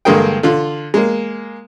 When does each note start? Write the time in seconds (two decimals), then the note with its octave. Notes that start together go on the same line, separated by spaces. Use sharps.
0.05 G2 D3 G#3 A#3 G#4 G5
0.43 D3 F4
0.94 G#3 A#3